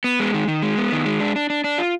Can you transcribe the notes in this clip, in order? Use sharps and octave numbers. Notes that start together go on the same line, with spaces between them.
B3
G#3
D#3
D#3
G#3
B3
D#3
G#3
D4
D4
D4
D4
F4